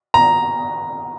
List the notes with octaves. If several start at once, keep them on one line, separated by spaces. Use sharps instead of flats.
A#5